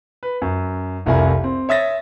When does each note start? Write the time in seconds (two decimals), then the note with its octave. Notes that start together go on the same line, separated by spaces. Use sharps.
0.23 B4
0.42 F#2
1.06 F1 C2 C3 E4 A#4 G#5
1.44 C4
1.69 C#5 E5 D#6 A6 A#6